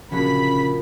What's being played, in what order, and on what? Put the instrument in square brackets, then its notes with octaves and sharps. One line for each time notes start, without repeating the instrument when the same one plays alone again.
[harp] A#1 F#4 [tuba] C#3 [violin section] B5 B6